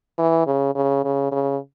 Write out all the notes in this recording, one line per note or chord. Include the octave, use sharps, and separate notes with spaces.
E3
C#3
C#3
C#3
C#3